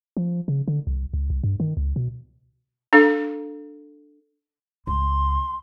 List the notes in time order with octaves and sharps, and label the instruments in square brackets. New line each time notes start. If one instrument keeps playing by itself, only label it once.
[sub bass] F3
C#3
D3
C2
C#2
C2
G2
D#3
C#2
B2
[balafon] D4 A4 F5
[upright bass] C#2 [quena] C6